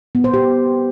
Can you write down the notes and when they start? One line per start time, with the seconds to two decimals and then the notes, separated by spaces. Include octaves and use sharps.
0.15 B3
0.24 C5
0.34 G4